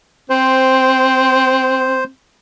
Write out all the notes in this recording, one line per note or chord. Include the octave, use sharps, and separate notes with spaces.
C4 C5